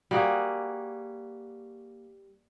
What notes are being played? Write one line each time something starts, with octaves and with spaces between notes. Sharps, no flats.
G3 A#3 F#4 G#4